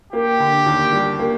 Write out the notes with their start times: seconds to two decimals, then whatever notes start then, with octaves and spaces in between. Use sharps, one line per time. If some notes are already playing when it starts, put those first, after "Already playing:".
0.13 A#3 G4
0.40 D3
0.66 D#2
0.93 G3
1.19 A#3